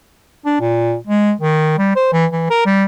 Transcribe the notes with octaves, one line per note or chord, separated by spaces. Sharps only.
D4
A#2
G#3
D#3
G3
C5
E3
E3
A#4
G3